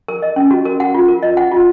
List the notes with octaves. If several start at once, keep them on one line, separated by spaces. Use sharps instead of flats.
A#4
D#5
C#4
F#4
A#4
F#5
F4
A#4
D#5
F#5
F4